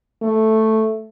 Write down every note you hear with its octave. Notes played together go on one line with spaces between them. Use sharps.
A3